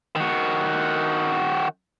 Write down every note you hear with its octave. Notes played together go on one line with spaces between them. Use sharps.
D#3 F#4